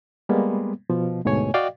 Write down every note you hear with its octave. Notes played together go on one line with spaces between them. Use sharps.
G3 G#3 A#3 B3
B2 F3
D2 G#2 B2 A3 C#5 G#5
F#4 D5 D#5 F5 G5